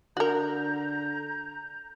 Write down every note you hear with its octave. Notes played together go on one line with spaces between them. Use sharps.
D3 F#4 A#4 A#5 G6